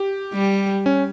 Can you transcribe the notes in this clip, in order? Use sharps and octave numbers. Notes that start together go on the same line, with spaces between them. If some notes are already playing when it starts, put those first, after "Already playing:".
Already playing: G4
G3
C#4